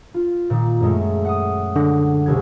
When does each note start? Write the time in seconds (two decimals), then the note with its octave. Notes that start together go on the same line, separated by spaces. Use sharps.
0.14 F4
0.50 A#2 D#3
0.80 F#2 G#3 A3
1.25 F#5 D#6
1.76 D3 F#5 A#6
2.26 E1 C2 G#6